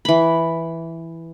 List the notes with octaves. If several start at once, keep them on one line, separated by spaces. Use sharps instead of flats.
E3 B5